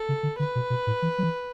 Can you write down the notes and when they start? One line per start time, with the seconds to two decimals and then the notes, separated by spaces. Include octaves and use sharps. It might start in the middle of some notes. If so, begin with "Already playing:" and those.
Already playing: A4
0.09 C#3
0.23 D3
0.39 D3 B4
0.55 B2
0.70 B2
0.87 A2
1.02 E3
1.18 F#3
1.23 E3